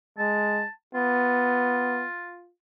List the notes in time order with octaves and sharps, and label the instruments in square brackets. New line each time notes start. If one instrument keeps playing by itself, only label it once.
[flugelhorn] G#3 [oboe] A5
[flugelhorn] B3 [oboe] F4